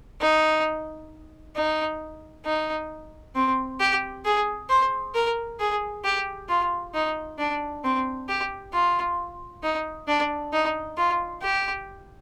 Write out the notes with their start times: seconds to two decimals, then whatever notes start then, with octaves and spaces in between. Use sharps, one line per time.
0.21 D#4
1.56 D#4
2.45 D#4
3.35 C4
3.80 G4
4.25 G#4
4.69 C5
5.15 A#4
5.60 G#4
6.04 G4
6.49 F4
6.94 D#4
7.38 D4
7.84 C4
8.28 G4
8.73 F4
9.63 D#4
10.08 D4
10.53 D#4
10.97 F4
11.42 G4